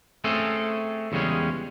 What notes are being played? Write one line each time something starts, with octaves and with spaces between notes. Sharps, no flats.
A3 C4 C#4 G#4 A4
E2 C#3 G3 G#3 C#4